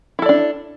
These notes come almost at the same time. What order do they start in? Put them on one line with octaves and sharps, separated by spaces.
E4 A4 D5 D4